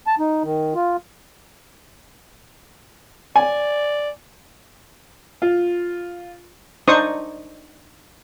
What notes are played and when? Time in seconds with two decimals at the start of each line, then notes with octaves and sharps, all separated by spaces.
0.07 A5
0.19 D#4
0.44 D#3
0.75 F4
3.36 D5 G#5
5.42 F4
6.88 D4 D#4 C5 C#6 D#6